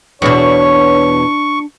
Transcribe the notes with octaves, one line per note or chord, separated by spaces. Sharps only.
E2 B2 D4 C#5 C#6